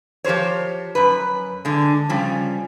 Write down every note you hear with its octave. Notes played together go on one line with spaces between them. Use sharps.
F3 G4 A#4 C5 C#5
F#2 B4
D3 G#3
C#3 F3 G3 C#4